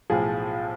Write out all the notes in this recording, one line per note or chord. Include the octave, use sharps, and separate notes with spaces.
B1 A2 F3 G#4